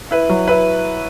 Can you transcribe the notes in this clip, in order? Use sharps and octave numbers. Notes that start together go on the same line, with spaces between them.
E4 B4
F#3
E4 B4